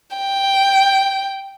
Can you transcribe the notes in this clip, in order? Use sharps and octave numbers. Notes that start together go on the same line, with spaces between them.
G5